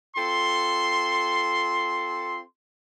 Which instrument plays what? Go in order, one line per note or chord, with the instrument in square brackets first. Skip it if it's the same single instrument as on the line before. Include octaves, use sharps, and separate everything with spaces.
[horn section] C4 F4 A4 C6